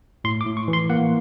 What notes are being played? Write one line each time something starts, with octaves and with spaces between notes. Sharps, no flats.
A2 C6
D6
A2
C#6
E3
C6
A#3 F#5